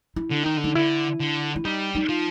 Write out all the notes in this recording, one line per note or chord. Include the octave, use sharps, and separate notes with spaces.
E4
D3
D#3 D#4
D3
D#4
D3 E4
D3
E4
G3 D#4
D#4
F3